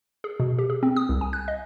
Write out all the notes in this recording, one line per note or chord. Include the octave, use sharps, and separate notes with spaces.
G#4
B2
G4
G#4
C4
D#6
C2
G#5
F#6
D#5